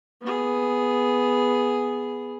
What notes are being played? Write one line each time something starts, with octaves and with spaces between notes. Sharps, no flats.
B3 G#4